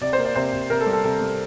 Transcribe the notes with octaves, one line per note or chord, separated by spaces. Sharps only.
C3 D5
C5
A#3
D5
C3 C5
C3
C3 A#4
A4
G3
A4
C3 A4
G3